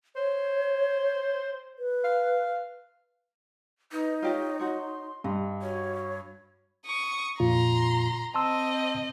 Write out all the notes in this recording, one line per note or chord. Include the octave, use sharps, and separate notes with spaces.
C5 C#5
B4
F5
D#4 B4
F4 G4 C#5 D#5
F#4 C#5 C6
G2 D#5
F#4 C#5
C#6 D#6
F2 A#2 F4 A#5 C6
C4 D#5 A5 C6 E6